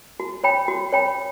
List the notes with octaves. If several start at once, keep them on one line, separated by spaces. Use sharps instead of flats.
F#4
C#5 G5 B5
F#4
C#5 G5 B5